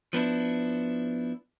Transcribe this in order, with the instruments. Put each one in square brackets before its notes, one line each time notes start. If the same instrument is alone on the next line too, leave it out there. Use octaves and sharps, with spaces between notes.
[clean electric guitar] F3 B3 D4 E4